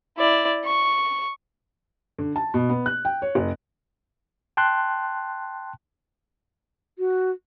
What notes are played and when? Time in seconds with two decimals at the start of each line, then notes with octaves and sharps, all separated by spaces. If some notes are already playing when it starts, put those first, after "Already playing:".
0.17 E4 D5
0.65 C#6
2.19 D3
2.36 A5
2.54 B2
2.69 B3
2.86 F#6
3.05 G5
3.22 C#5
3.35 F#1
4.57 G5 A5 C6 F#6
6.99 F#4